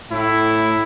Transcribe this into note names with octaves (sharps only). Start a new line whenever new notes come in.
A2 E4